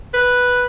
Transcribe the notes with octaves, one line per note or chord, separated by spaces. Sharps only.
B4